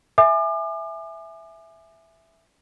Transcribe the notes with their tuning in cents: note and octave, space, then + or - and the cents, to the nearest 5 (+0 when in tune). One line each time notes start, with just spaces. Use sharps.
E5 +0 G#5 +0 D6 +40